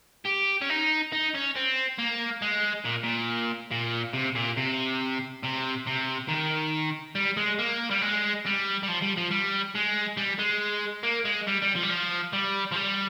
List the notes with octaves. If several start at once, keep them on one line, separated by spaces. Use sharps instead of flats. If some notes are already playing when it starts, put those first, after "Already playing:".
G4
C#4
D#4
D#4
C#4
C4
A#3
G#3
A#2
A#2
A#2
C3
A#2
C3
C3
C3
D#3
G3
G#3
A#3
G3
G#3
G3
G3
F3
G3
F3
G3
G#3
G3
G#3
A#3
G#3
G3
G3
F3
G3
F3
G3
F3
G3